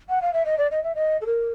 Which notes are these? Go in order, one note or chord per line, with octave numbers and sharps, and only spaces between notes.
F#5
F5
E5
D#5
D5
D#5
E5
D#5
A4
A#4